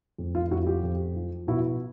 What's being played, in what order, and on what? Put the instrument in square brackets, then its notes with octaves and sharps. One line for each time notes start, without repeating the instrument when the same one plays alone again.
[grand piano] F2
F4
F2 E4 F#4
F4 G4
F2
F3
B2 E4 F#4